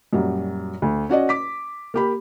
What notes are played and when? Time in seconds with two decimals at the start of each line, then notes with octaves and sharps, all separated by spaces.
0.13 F#2 A#2 F#3 G3
0.82 D2
1.09 C#4 F#4 D5 D#5
1.29 D6 B6
1.94 A#3 G4 B5